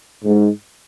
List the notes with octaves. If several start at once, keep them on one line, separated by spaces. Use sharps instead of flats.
G#2